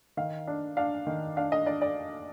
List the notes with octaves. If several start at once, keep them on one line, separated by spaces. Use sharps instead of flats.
D#3 F5
D4
D4 F5
D#3
D4 F5
D#5
D4 D5
D5